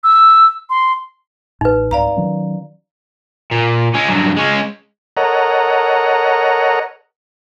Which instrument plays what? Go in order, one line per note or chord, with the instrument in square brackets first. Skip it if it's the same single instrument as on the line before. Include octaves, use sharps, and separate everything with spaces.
[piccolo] E6
C6
[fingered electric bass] A1 A2 [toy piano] D#4 B4
[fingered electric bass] C2 G#2 [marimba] D5 F5 A#5
[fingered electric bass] D#3 F#3 C#4
[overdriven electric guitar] A#2
G#3 C#4
G2 F#3
G#3 C#4
[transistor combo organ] A4 A#4 C#5 D#5 F#5 A#5